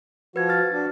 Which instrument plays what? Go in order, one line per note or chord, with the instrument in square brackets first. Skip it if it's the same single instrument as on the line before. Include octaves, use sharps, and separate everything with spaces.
[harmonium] F3 F#4 [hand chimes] B4 G#6
[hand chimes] F6 A6
[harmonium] D4 F#4